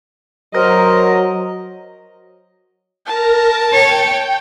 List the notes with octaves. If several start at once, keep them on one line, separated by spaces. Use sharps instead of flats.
F#3 A#4 C5 D#5
A#4 A5 A#5
C#5 G5